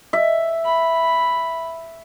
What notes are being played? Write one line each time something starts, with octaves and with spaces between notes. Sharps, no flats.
E5
B5